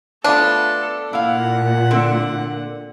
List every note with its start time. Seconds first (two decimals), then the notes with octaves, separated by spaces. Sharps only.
0.24 A3 B3 D4 F4 A4
1.13 A#2 E4 F5 F#5
1.91 D3 C4